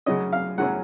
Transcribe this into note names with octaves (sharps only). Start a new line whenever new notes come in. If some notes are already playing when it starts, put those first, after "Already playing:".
F#2 C#3 F#3 C#4 D#5
F5
F#2 C#3 F#3 C#4 F#5